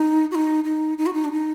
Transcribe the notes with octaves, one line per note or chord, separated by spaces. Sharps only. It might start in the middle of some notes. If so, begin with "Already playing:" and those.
Already playing: D#4
F#4
D#4
D#4
D#4
F#4
D#4
D4
D#4